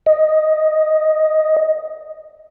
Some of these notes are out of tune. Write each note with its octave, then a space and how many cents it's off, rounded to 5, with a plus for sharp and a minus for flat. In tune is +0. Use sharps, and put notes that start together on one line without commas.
D#5 +0